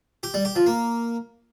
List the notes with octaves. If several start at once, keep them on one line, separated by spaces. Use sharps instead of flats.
G4
G3
G4
F3
A#3